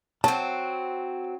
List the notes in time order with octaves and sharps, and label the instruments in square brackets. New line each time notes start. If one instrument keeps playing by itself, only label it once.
[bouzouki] F#3 C4 [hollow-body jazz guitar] A5